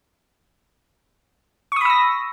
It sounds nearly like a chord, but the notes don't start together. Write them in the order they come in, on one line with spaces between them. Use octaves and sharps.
C#6 D#6 B5 E6 A#6